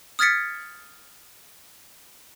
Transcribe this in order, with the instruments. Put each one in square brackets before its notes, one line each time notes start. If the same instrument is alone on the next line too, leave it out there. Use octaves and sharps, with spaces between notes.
[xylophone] D#6 F6 G#6 A6 B6 C#7